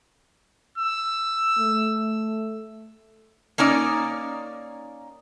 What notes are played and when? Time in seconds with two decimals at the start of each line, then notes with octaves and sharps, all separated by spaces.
0.78 E6
1.58 A3
3.58 A#3 C#4 D#4 D5